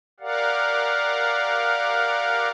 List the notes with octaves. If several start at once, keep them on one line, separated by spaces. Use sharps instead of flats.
G4 A#4 D5 F5 F#5